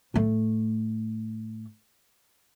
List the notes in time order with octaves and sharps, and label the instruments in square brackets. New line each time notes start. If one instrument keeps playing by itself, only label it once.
[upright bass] A2 A3